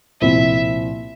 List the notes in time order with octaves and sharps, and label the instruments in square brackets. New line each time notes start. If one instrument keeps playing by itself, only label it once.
[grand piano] C2 A#2 F3 C4 E4 [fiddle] E5